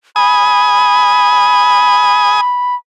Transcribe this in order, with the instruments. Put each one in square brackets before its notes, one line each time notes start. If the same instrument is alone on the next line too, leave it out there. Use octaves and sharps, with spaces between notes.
[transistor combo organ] G#5 D#6 [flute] B5